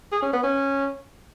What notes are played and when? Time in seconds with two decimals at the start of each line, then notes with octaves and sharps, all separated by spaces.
0.12 G#4
0.22 C#4
0.33 B3
0.44 C#4